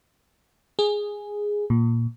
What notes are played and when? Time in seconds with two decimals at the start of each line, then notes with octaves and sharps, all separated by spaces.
0.79 G#4
1.70 A#2